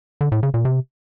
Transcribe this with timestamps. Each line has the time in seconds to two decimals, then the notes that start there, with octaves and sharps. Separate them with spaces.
0.21 D3
0.32 A2
0.43 C#3
0.54 A#2
0.65 C3